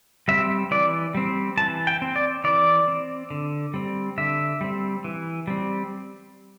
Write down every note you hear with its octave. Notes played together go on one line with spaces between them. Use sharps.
G3 C4 E5
E3 D5
G3 C4
E3 A5
G5
C4
D5
E3 D5
C4
D3
G3 C4
D3 E5
G3 C4
E3
G3 C4